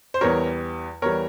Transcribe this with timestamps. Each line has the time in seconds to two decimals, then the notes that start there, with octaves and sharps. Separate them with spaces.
0.14 C5
0.21 E2 E3 G3 A#4 C#5
1.02 E2 E3 G3 A#4 C#5